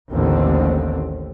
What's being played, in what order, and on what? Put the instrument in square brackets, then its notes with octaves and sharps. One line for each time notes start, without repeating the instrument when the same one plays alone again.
[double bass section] A1 D#2 D3 C4